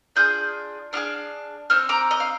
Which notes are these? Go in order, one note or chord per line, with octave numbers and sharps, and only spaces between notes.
D4 F4 G#4 D#6 G6
D4 F4 G#4 D6 F6
C4 D#4 F6
A#5 D6
D#5
F5